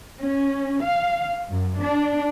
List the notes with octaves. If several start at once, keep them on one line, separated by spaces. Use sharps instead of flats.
C#4
F5
F#2
D4